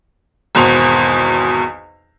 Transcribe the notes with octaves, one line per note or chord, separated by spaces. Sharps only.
G#1 E2 B2 C5 F7